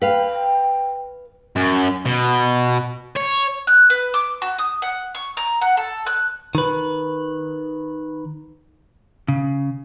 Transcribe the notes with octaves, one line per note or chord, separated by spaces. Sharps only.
B4 F5 G5
F#2
B2
C#5
F#6
B4
D6
F#4
D#6
F#5
C#6
A#5
F#5
A4
F#6
D#3 B4
C#3